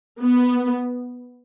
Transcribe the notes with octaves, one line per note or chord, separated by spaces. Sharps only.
B3